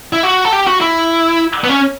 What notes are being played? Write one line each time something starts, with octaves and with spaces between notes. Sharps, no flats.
E4
F#4
A4
G4
F#4
E4
B3
C#4